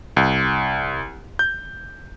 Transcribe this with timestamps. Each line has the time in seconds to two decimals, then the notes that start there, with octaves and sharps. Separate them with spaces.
0.17 C2
1.39 G6